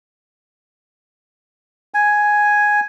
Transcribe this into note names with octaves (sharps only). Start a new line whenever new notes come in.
G#5